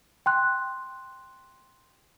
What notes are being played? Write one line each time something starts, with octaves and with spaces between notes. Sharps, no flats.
G5 C6 F#6